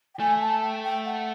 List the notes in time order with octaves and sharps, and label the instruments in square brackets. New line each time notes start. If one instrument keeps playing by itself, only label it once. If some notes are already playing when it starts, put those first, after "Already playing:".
[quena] G5
[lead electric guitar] A3 [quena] G#5
[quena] A5
G5
G5
F#5